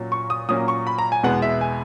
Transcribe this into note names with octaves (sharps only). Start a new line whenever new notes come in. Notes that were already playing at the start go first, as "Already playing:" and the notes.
Already playing: A#2 F#3 C#4
C#6
D#6
A#2 F#3 A#3 C#4 D#6
C#6
B5
A#5
G#5
E2 B2 G#3 B3 F#5
E5
G#5